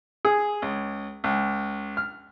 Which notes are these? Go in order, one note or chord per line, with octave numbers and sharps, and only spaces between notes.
G#4
C#2
C#2
F6